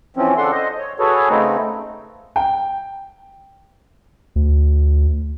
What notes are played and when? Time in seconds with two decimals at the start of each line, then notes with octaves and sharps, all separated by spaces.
0.17 E3 F3 C4 C#4
0.37 C#3 D4 A4 F#5 C6
0.52 C5 D#5
0.78 C#5
0.99 F#4 G#4 A4 B4 C#5
1.29 C#3 A3 B3 C4 D#4
2.36 G5
4.36 D2